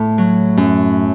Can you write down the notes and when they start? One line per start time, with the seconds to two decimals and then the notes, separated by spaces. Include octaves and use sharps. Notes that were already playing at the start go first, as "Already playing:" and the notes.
Already playing: A2
0.18 F#3
0.57 F#2